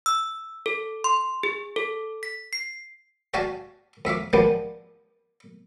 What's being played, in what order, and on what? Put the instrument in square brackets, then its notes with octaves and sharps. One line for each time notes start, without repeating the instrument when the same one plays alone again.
[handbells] E6
A4
C6
G#4
A4
B6
C7
[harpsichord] F#4 G4 D5 F5 G#5 A5
F2 E5 F5 D6
F3 G3 G#3 A#3 B3 D4